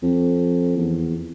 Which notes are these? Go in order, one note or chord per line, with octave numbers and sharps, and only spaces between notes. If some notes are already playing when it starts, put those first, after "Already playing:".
F2
E2